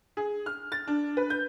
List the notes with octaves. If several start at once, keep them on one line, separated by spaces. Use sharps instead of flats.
G#4
F6
A6
D4
B4
G6